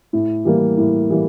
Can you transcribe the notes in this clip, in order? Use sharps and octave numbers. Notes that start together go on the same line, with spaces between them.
A2
E3 G3 A#3
A2
E3 G3 A#3